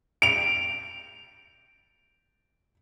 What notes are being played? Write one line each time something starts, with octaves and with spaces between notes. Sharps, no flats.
D7 F7